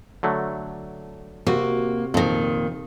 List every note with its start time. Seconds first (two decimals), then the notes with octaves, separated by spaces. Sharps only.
0.23 D3 F#3 A3
1.47 C3 A#3 F#4
2.14 F2 A#2 D#3